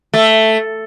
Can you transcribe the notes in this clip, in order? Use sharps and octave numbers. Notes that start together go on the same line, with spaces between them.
A3